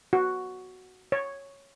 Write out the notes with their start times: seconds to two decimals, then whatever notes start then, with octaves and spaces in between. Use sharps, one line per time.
0.13 F#4
1.12 C#5